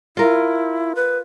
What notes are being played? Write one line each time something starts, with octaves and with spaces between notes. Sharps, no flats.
E4 F4 A#4
B4